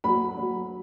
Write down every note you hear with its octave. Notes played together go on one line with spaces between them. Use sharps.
F#3 B5
F#3